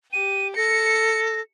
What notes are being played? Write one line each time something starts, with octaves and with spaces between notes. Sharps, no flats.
G4 D#7
A4 A#6 C#7